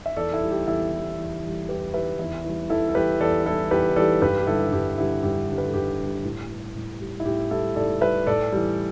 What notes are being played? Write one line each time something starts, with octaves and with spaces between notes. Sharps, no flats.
E5
E2 A4 D5
E4 A4
E3 G3
G4
E2 E4 A4
E3 G3
E2
E3 G3
E2 G4 B4
E3 G3 B4 E5
E2 E4
E3 G3
E2 E4 A4
A4
E3 G3 G4 B4
E2 A4 D5
E3 G3 E4 A4
E2 G4 B4
E3 G3 A4 D5
G2 G4 B4
G4
D3 G3 E4 A4
G2 G4
D3 G3 E4
G2 G4
D3 G3
B4
A4
G2 G4
D3 G3
A2
G3
A2
G3
E4
A2 G4
G3 E4 A4
A2 A4 D5
G3 B4 E5
A2 A4 D5
E3 G3